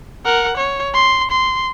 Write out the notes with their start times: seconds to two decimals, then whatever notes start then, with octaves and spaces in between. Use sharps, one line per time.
0.25 A#4 F#5
0.57 C#5
0.94 C6
1.30 C6